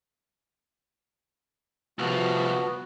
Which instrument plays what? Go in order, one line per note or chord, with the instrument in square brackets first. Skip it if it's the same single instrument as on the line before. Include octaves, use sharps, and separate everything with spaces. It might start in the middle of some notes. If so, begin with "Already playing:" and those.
[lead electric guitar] C2 F3 [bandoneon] B3 F#4